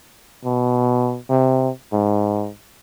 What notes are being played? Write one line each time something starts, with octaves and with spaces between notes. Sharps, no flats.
B2
C3
G#2